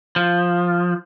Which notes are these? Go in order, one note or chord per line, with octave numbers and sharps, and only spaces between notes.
F3